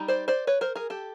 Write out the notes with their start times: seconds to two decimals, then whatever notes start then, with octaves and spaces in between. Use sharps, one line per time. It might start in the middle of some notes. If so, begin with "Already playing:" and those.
Already playing: G3 D#4
0.08 C5 D5
0.28 C5 D5
0.47 B4 C#5
0.61 A#4 C5
0.76 G#4 A#4
0.90 G4 A4